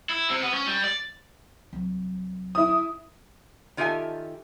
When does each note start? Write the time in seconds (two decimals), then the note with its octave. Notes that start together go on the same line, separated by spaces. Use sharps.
0.09 E4
0.30 C3
0.42 B3
0.53 C#4
0.67 G3
0.84 D5
1.73 C2 F#3
2.55 E4 D#6
3.77 D#3 F4 G4 A4 E5 G#5